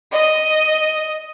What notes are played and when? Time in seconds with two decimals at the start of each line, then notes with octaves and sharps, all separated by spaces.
0.13 D#5